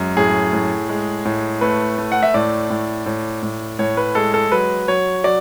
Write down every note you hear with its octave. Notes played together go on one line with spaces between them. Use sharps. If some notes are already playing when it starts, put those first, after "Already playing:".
Already playing: F#2 G#3
A2 G#4
A2
G#3
A2
A3 B4
A3
F#5
E5
A2 D5
A2
A2
A2
A2 C#5
B4
G#3 A4
A4
F#3 B4
F#3 C#5
F#3 D5